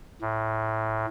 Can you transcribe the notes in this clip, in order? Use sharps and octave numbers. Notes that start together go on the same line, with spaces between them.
A2